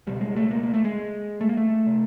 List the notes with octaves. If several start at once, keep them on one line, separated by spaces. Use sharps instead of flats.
C#2 B2 G3
G#3
A3
A#3
A#3
A3
G#3
A3
A#3
A3
C3